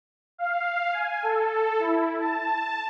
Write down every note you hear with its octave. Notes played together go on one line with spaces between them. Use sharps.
F5
G#5
A4
E4
A5